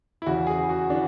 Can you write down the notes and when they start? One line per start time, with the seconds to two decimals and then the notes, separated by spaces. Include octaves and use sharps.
0.22 E4
0.26 E2 C#3 E3 F#4
0.47 G#4
0.69 F#4
0.90 C#3 E3 D4